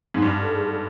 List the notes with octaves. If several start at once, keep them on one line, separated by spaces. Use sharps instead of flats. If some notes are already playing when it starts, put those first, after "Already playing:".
G#2
G2
A4
G#4
A4